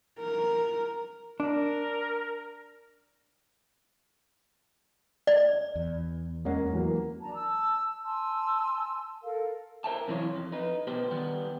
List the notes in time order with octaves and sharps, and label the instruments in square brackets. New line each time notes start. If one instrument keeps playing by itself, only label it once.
[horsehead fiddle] A#4
[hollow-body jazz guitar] D4 [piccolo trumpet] A#4
[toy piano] D5
[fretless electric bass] E2
[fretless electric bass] E2 G#3 [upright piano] A#3 C#4 F#5
[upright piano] E3 F#3 A#3
[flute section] D4 A5 A#5
A5 E6
G#5 A5 C6 E6
A4 A#4 F5
[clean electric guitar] A#4 C5 E5 A5
F#2 C3 E3 F4 C5 C#5
F2
D#4 B4
B2 G4 B4 C5
D#3 G3 B3